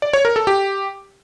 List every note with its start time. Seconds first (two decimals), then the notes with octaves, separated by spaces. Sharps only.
0.02 D5
0.13 C#5
0.25 A#4
0.36 A4
0.47 G4